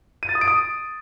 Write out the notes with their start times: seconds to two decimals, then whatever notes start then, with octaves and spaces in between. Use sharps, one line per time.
0.23 D#7
0.29 A6
0.35 D#6
0.41 D7
0.48 D#6